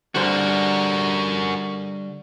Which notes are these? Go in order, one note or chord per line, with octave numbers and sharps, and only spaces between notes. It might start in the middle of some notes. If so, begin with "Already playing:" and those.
D3 G3 F#4 A#4 C5